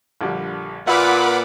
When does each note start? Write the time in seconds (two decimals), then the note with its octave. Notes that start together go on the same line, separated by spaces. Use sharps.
0.21 A#1 D3 G3
0.87 A#2 F4 B4 E5 F#5 B5 D6